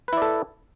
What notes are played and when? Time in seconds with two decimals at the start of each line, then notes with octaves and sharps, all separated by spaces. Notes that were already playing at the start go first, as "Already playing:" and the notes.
0.08 B4
0.13 E4
0.17 D5
0.22 A4